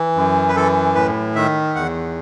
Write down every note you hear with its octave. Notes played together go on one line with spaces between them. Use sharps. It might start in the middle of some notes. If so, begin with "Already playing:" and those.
Already playing: E3
F#2
B4
E3 A4
A2 B4
D#3 E5
E2 F#5